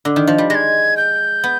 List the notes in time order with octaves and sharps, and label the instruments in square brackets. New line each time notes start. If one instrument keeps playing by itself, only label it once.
[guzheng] D3
D#3
F3
G3
[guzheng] G#3 [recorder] A#6
[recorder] G#6
G6
[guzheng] B3